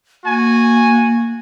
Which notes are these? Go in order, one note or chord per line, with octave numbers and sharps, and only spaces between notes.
A#3 F#4 G#5